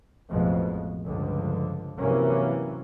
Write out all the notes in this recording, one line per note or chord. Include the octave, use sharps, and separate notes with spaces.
A1 F2 B2 F3 G#3
C#2 G2 D3 F3
C3 E3 F#3 A#3 C#4